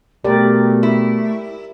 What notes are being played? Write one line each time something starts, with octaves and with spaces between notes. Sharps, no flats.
B2 A3 G4 A#4 D5
E4